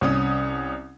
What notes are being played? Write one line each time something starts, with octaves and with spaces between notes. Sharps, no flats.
C2 C#4 D#6